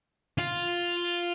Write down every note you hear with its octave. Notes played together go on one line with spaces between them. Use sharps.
F4